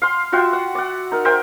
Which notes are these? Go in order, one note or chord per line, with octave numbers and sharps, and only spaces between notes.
F5 C6
F4 F#4 E5 G5
F#5
D5 F#5
D#4 A#4
A#4 C5 E5 G5